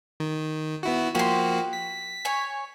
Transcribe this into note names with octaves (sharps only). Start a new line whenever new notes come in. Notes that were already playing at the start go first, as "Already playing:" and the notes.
D#3
B3 E4 F#4
F3 A#3 F#4 G4 C6
B6
C#5 G#5